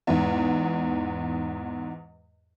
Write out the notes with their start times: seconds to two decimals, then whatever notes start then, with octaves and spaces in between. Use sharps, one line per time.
0.07 E2 G#2